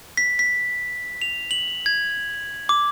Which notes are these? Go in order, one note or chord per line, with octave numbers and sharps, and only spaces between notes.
B6
B6
F7
F#7
G#6
D6